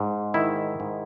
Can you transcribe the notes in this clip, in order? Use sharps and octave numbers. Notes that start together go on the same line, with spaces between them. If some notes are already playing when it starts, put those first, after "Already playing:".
Already playing: G#2
D#3 E4
G#2